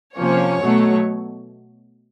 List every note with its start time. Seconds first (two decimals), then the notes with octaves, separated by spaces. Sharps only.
0.18 C3 F3 A#3 C#4 C#5
0.61 B2 F#3 A3